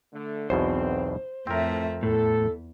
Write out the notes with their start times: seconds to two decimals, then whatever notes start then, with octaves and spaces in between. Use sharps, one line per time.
0.12 D3 A3
0.50 B1 E2 B2 C4 C5
1.47 F2 A2 A3 C4 A#4 E5
2.03 E2 A2 A4